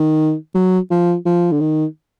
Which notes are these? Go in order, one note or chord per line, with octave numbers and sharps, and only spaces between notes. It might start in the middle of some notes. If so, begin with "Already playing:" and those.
Already playing: D#3
F#3
F3
F3
D3
D#3